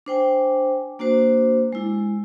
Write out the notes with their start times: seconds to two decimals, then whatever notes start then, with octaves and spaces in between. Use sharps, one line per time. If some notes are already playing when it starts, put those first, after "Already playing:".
0.06 D4 C5 G5 G#5
0.99 A#3 D4 F#4 C5
1.73 G#3 E4